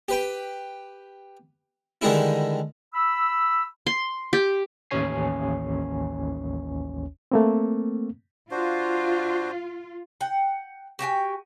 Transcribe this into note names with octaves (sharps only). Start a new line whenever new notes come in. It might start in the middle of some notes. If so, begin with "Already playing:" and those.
G4 B4 G5
D3 D#3 G3 G#3 D#4 E4
B5 E6
C6
G4
A1 D#2 C#4 C#5 G#5 C7
A3 A#3 C4
D4 F4 F#4 C5
F#5 G5
F#4 G4 G5 G#5